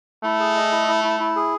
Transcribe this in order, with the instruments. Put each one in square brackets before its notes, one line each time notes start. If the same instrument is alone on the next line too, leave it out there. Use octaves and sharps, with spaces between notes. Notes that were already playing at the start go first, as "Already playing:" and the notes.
[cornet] A3 [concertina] E4
[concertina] G#4
D#5
E4
E4
E4
E4
G#4